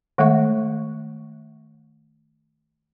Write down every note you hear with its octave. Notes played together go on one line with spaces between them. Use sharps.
D#3 G#3 A3 A4 E5 C#6